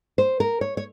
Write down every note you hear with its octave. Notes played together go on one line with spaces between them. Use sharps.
C5
A#4
C#5
C#5